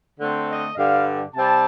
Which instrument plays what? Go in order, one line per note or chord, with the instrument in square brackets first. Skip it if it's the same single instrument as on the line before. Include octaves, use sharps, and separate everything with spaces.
[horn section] D3 A3 C4 C5
D#5
G2 D3 G3 D4 F5
C3 G3 C4 A5